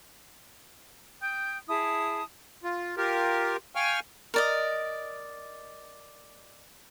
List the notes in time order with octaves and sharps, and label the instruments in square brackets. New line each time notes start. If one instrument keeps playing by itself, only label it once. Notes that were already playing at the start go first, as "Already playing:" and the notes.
[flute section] G5 D#6 G6
E4 G#4 A5 D#6
[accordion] F4
F4 G4 A#4
F5 G5 G#5 C#6 F6
[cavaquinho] A#4 D5 D#5